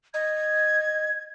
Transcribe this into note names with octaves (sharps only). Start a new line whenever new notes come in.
D#5 G#6